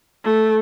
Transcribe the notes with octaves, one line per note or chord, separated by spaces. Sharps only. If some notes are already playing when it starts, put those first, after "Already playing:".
A3